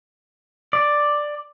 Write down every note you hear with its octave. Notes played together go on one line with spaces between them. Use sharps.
D5